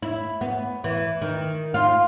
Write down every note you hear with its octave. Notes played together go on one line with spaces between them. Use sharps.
E4
B3
E3
D#3
F4